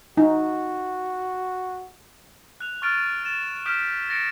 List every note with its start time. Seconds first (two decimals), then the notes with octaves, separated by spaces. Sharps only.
0.17 D#4 F#4
2.60 F#6 F7
2.82 C#6 F6 A6 D7 D#7
3.24 A6 E7
3.66 D#6 F6 G6 B6 D7 E7
4.09 A6 A#6 C#7 D7